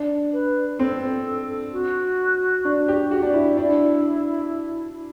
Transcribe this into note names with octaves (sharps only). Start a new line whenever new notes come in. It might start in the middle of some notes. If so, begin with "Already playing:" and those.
Already playing: D4
B4
C4 A4
F#4
D4
G4
F#4
D4
E4
D4 E4